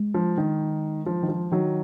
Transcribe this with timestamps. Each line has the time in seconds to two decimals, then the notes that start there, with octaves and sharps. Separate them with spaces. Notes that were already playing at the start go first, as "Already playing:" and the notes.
Already playing: G#3
0.14 F3
0.38 D#3
1.06 F3
1.23 D#3
1.29 F3
1.52 D#3 F#3